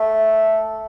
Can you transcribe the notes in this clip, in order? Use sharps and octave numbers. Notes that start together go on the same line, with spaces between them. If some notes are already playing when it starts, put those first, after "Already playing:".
Already playing: A3